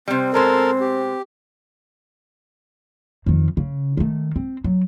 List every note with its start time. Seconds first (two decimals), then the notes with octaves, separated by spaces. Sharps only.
0.08 C3 G3 C4
0.34 B2 G#3 A4 A#4 C5
0.81 G4
3.26 F2 D#3
3.57 C#3
3.97 D#3 A3
4.36 C4
4.64 F#3